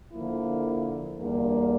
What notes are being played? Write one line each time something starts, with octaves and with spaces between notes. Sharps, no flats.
D3 F3 A#3 E4
E2 D3 G3 A#3 D4